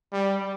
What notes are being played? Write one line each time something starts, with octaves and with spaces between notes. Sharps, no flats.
G3